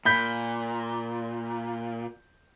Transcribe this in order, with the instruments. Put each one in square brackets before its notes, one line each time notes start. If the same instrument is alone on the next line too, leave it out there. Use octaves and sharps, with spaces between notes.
[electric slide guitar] A#2 [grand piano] B5 G6 B6